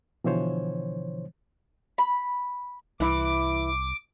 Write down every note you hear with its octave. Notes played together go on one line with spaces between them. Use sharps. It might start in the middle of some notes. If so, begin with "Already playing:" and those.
B2 D3 E3 F3 C5 C#5
B5
C2 E3 E4 D6